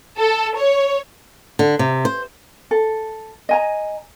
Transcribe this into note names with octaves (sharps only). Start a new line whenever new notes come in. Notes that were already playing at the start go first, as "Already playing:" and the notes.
A4
C#5
D3
C3
C5
A4
D#5 G#5 A#5